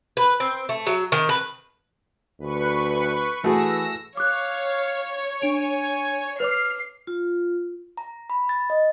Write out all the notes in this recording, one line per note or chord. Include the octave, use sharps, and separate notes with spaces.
B4
C4
A3
F#3
D#3
B4
D2 B4 C#6
E3 A3 F#4 G#4 E6 A#6
C#5 F5 D6 F#6
D4 G#5 D7 F7
B4 C#5 D6 F6 C7
F4
A#5
B5
A6
D#5